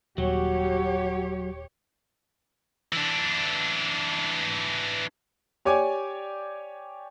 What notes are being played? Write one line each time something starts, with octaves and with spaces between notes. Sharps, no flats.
D#1 F#3 F#4 G4 C#5
E3 D4
G4 C#5 D5 G#5 D6